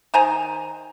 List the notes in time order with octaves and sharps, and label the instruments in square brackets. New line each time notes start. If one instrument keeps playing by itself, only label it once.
[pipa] D#3 C5 G#5 A#5